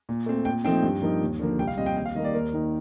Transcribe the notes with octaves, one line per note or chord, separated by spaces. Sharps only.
A#2
A3 C4
A#2 G5
F3 A3 C4 D#4 G5
G2
F3 A#3 D#4
D#2
D3 F3 A#3
C2 G5
F5
A#2 G3 C4 D#5
G5
D#2 G5
F5
D#3 G3 A#3 D#5
D5
D#2 A#4
D#3 A#3 D#4